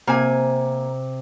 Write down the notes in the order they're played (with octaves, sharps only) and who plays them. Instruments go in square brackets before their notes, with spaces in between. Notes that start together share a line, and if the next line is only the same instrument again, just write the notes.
[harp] C3 [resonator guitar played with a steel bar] A#3 G#5